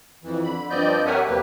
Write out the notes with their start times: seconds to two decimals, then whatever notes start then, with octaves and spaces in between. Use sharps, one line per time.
0.23 F2 E3
0.44 D3 B5
0.70 G2 F3 C4 D5 D#5 G6
1.06 G4 A#4 C#5 E5 F#5 G#5
1.26 E2 C3 F#3 A#3 G4 B4